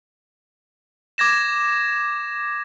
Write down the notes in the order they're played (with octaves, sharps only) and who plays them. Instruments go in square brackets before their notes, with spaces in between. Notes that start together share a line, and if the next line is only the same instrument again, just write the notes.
[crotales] D6 G#6 A#6 E7